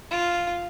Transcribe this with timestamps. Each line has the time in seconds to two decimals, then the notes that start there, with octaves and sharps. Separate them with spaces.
0.11 F4